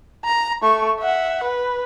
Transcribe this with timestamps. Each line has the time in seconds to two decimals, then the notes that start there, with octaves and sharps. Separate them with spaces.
0.25 A#5
0.62 A3 C#6
0.99 E5 F#5
1.44 B4